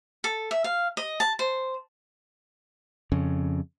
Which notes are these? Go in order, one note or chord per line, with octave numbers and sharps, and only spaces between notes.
A4
E5
F5
D#5
A5
C5
F2 C#3